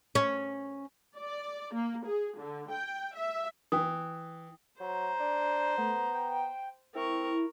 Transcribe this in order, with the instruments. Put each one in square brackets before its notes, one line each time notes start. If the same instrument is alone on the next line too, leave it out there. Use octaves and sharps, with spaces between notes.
[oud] C#4
[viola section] D5
A#3
G#4
D3
G5
E5
[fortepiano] E3 [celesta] G5 D#6
[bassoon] F#3 [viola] C5 [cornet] A#5
[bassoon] D4
[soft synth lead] A3 [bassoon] B3
[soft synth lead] G5
[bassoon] C4 [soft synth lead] E4 [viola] A#4 C#6